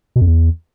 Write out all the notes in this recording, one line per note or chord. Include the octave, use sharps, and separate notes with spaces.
B2
F2
E2